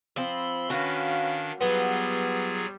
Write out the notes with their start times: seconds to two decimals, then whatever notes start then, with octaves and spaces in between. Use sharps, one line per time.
0.16 F3 C4 B5 C6 E6
0.70 D#3 C#4 D4 F#4 B4 F5
1.61 F#3 G3 B3 F4 G#4